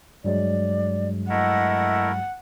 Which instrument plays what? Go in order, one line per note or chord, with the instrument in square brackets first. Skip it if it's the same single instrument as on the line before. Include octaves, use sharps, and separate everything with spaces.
[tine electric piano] G2 F#3 G#3 [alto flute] D5
[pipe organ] A3 E4 A#4 [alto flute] D#5 [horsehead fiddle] F#5